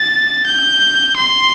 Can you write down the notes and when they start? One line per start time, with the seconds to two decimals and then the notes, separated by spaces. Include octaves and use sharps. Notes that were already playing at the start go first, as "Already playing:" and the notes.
Already playing: A6
0.46 G6
1.16 C6